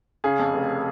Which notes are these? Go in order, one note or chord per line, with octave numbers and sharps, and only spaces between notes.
C#3 G#4
F2
F1